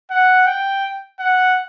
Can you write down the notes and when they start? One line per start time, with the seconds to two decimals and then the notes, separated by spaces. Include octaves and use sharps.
0.11 F#5
0.47 G5
1.19 F#5